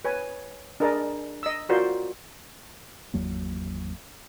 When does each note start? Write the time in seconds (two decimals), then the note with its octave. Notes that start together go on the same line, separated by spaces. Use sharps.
0.05 B4 C#5 G#5
0.80 D4 G#4 A#4 D#5 A5 B5
1.43 D#5 E6
1.69 F4 F#4 A#4 C5 D5
3.14 G#1 E2 F#3 A#3